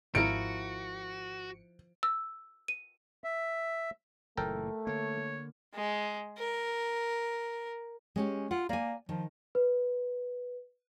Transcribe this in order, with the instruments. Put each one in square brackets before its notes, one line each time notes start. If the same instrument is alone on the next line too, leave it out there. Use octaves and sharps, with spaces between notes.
[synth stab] G#1 C#7 [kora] F3 E4 A#4 [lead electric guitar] F#4 [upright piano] D7
[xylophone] E6
D#7
[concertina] E5
[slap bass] F#1 A#2 E3 [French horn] A3 [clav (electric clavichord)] A4 A#4 G5
[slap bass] D3 A#3 [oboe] C#5
[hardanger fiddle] G#3
A#4
[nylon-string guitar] G#3 C#4 G4
[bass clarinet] F4 [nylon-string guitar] F#5
[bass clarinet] A#3 [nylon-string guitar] D5 G#5
[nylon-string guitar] D#3 [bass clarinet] F3
[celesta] B4